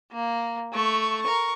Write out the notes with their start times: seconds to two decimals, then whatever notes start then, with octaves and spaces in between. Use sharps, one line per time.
0.12 A#3
0.73 A3 C#6
1.22 A#4 C#6